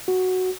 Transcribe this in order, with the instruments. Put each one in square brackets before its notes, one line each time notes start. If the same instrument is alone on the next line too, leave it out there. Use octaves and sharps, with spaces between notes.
[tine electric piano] F#4